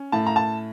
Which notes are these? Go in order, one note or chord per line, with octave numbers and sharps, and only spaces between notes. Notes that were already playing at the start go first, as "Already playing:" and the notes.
Already playing: C#4
A2 A5
A#5
A5